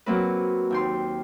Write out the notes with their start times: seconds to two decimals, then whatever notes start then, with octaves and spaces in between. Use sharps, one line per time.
0.06 F#3 A#3 C4 B4
0.70 D#2 G5 C6